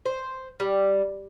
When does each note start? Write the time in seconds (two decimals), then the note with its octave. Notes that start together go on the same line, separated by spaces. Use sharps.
0.06 C5
0.60 G3